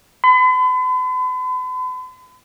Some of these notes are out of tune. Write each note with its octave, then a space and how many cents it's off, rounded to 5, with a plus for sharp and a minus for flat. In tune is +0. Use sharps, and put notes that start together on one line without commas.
B5 +45